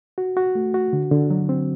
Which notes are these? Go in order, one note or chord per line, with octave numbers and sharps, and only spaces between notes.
F#4
F#4
A3
F#4
D3
D3
F#3
C4